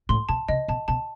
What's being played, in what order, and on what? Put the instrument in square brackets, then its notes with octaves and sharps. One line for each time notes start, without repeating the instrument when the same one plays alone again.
[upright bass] A2 [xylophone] C6
[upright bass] B2 [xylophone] A5
[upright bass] C3 [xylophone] D#5
[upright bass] B2 [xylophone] A5
[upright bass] B2 [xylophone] A5